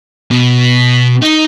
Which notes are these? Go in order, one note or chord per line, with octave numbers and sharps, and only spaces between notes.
B2
D#4